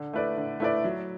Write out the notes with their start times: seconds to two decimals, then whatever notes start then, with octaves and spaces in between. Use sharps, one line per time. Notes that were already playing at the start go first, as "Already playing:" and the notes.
Already playing: D3
0.13 A3 E4 B4 D5
0.37 D3
0.60 A3 E4 B4 D5
0.84 F#3